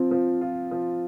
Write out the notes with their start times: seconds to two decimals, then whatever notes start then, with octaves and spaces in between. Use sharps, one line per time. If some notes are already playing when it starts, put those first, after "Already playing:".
Already playing: F3 C4 F4
0.11 F3
0.41 F4
0.71 F3